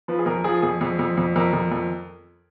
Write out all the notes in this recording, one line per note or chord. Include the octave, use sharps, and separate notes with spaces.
F3 B4
G#4
F2 A#4
F3 G#4
F2 G#4
F2
F2
F2
F2 A#4
F2
F2